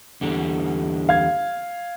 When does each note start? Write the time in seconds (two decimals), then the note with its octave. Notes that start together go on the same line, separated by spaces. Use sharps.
0.21 E2 D3 G3
1.09 F5 G#6